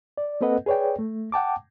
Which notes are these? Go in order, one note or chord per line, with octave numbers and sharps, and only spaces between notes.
D5
A#3 C4 A4 B4 D#5 F#5
G#4 B4 C#5 D5 G5
A3
F#5 G5 A5 D6